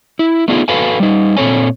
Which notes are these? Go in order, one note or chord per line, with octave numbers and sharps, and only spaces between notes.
E4
A3 B3 D4 D#4 F4 G#4
F#4 A4 B4 F5 G#5
G3 D#4
A#2 C4 A4 C#5 G#5